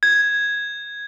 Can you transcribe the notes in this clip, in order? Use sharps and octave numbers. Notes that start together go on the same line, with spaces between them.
G#6